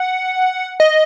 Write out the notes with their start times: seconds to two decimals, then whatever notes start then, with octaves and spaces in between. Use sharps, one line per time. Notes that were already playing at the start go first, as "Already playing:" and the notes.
Already playing: F#5
0.80 D#5